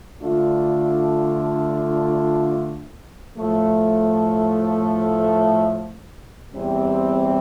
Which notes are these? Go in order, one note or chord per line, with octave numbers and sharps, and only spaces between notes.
D3 A3 D4 F4
A2 F3 A3
E2 C3 G3 C4